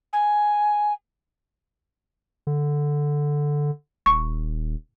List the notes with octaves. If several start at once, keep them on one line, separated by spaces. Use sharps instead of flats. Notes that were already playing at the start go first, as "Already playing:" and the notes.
G#5
D3
D#1 C#6